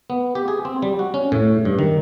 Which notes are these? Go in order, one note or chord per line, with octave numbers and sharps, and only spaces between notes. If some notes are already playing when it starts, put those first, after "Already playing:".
B3
G4
G#4
C4
G3
F#4
C#4
A2
G2
D#3